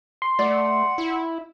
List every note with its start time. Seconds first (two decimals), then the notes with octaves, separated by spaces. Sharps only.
0.22 C6
0.39 A3 D5 F#5
0.98 E4